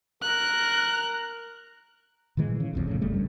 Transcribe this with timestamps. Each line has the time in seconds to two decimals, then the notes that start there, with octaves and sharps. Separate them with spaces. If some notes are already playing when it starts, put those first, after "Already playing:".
0.22 A#4 F#6
2.37 A#2 D#3 E3 G#3
2.60 C#3
2.73 F#1 C2 F2
2.87 E2 A2 C#3
3.01 G1 C#3 G3 A3
3.14 G2